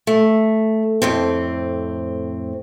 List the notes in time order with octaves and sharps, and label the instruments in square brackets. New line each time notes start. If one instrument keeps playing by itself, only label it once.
[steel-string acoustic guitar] A3
F2 A2 C4